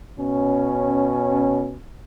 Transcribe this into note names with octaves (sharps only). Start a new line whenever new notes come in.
B2 C#4